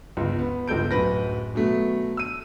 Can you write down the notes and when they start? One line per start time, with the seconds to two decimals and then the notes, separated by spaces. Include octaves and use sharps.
0.17 G1 C#2
0.39 B3
0.68 G1 C#2 A4 G6 D7
0.91 D1 F#2 B4 A#6
1.55 B2 F#3 A3 B3
2.17 E6 D#7